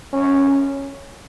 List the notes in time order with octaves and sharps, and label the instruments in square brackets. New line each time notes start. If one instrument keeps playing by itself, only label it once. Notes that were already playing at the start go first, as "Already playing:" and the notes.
[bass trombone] C#4